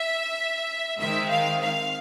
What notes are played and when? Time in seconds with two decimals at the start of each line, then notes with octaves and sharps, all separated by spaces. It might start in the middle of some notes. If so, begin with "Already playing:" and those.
Already playing: E5
0.98 D#3 G#3 C4 E5
1.30 F5
1.62 F5